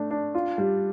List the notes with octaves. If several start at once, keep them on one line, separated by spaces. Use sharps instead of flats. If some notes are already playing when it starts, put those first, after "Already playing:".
Already playing: A3 D4
D4
F4
G3